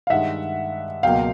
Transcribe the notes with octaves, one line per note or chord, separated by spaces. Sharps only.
F5
G2 D#3 G#3 E5 F#5
C#2 B2 F#3 A#3 F5 G5